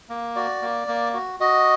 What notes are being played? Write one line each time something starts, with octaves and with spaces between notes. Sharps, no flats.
A#3
F#4 D5
A#3
A#3
F#4
F#4 D#5